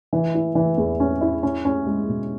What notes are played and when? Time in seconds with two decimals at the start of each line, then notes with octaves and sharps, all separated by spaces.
0.13 E3
0.34 E4
0.55 E3
0.78 E2
1.00 C#4
1.21 E4
1.43 C#4
1.65 C#4
1.86 G#3
2.08 B2